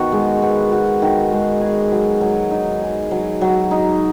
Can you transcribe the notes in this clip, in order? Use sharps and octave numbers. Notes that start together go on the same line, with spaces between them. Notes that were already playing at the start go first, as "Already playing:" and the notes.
Already playing: D#3 B3 F#4
G#3
B3
F#4
D#3
G#3
G#4
F#3
F#3
D#4
G#4
F#3
F#3
D#4